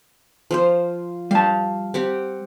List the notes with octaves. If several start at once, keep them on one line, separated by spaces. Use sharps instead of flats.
F3 F4 C5
G3 F5 A5
C4 G4 F#5